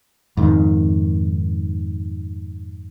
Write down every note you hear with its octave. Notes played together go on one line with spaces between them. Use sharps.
F2 G#2 D#3